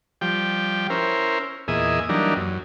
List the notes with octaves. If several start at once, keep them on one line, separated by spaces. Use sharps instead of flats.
F3 G3 G5
C#4 E4 A#4 C5
E2 A#2 G#4 D#5 E5
E3 F#3 G3 A#3 D4 D#4
F#2